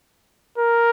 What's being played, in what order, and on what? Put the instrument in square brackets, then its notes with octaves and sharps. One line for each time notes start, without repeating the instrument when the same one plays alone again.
[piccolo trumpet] A#4